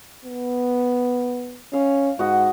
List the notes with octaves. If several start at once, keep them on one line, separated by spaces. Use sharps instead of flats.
B3
C#4 F5
G#2 F#4 D#5